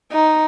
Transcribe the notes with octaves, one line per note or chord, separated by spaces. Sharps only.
D#4